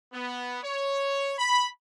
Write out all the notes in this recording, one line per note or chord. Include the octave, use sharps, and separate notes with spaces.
B3
C#5
B5